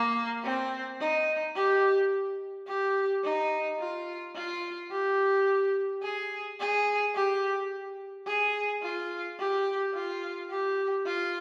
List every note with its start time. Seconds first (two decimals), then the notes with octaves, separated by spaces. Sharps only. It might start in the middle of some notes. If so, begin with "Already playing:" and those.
Already playing: A#3
0.44 C4
1.00 D#4
1.55 G4
2.67 G4
3.24 D#4
3.79 F4
4.35 F4
4.91 G4
6.02 G#4
6.59 G#4
7.15 G4
8.27 G#4
8.82 F4
9.39 G4
9.94 F4
10.50 G4
11.06 F4